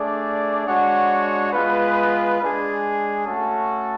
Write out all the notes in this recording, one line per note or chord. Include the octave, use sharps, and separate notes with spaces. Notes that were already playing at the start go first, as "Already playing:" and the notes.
Already playing: A3 D4 G#4 D5
G#3 D4 F#4 C#5 F#5
G#3 B3 F4 B4
G#3 D4 G#4
A3 C#4 F#4 A4